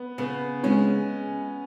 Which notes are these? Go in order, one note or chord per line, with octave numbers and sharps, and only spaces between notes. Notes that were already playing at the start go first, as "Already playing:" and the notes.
Already playing: B3
C#3 B3
G#3 C#4